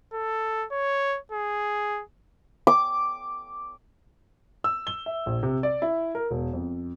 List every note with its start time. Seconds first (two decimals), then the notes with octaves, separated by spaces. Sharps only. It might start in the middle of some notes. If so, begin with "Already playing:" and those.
0.13 A4
0.72 C#5
1.32 G#4
2.67 D6
4.64 E6
4.87 G7
5.06 E5
5.26 A#1
5.43 C3
5.63 D5
5.82 E4
6.15 A#4
6.31 E1
6.53 F2